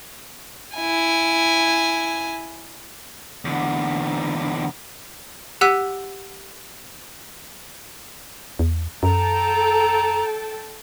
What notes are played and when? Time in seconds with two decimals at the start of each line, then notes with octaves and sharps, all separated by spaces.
0.77 E4 G#5
3.45 E2 D3
5.61 G4 F#5 E6 F#6 B6 D#7
8.59 E2
9.03 F#2 A4 G5 A5 A#5